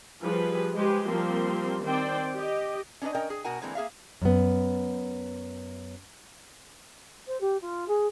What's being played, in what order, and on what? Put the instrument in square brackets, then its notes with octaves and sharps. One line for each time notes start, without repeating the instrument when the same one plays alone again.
[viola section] F3 G3 G#4 B4
G#3 G4 B4 C5
F3 G3 A#3 C4 C6
D#3 C4 C5 D5 G5
G4 D#5
[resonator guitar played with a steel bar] C#4 D4 A#4 B4 D#5
C#4 A#4 D#5 G5
G#4
B2 F#4 A#4 F#5 G#5
D3 E3 G#3 A#3 C4
A#3 G#4 E5 F5
[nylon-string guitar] F#2 B3
[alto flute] C5
G4
F4
G#4